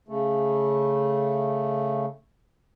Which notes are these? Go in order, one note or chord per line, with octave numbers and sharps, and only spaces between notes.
C#3 A3